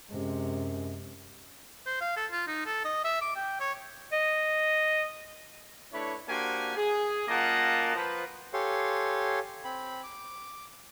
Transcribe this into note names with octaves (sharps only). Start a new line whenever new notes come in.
F#2 C3 G#3
C5
F5
A4
F4
D#4
A4
D#5
E5
D6
G5
C#5
D#5
A3 D4 E4 B4 C#5
A#3 D4 F#4 G4 C5 G#5
G#4
F#2 A#3 F4 D#5 F#5 A5
F3 B4
G4 A4 C#5 F5 G#5 C6
C4 B5
D6